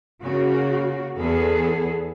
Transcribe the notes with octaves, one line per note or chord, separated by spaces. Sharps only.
C#3 A#3 F#4
E2 B3 G#4 A4